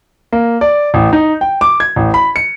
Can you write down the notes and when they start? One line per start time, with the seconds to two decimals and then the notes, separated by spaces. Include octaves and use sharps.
0.32 A#3
0.61 D5
0.94 A1
1.13 D#4
1.41 G5
1.61 D6
1.80 G#6
1.96 A1
2.14 B5
2.36 C#7